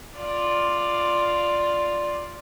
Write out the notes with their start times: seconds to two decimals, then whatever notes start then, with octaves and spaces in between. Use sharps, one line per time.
0.16 F4 D5